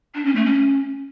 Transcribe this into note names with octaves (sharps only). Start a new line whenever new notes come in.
D4
C#4
A3
C#4